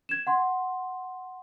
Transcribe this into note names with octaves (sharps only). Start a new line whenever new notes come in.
G#6 E7
F#5 C6